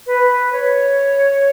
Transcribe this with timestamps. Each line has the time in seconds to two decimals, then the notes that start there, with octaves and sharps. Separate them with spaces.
0.07 B4
0.52 C#5